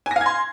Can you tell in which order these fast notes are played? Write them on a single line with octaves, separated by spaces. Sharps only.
G#5 A#6 F5 G#6 C6